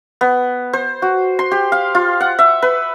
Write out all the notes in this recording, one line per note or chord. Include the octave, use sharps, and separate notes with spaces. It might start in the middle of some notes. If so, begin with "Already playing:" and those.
B3
C5
F#4
C6
G4
F5
F4
F#5
E5
B4